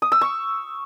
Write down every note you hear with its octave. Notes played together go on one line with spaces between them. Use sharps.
D#6
E6
C#6